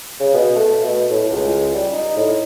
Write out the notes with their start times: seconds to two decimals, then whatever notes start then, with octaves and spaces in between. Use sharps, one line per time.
0.20 C#3
0.34 B2
0.55 A3
0.83 B2
1.10 A2
1.31 C#2
1.74 G3
1.93 D#4
2.16 A2